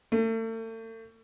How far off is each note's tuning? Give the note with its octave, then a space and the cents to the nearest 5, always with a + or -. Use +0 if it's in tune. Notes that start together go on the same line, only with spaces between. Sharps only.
A3 +40